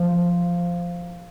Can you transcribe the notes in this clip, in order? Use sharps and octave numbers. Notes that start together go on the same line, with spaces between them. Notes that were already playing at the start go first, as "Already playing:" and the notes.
Already playing: F3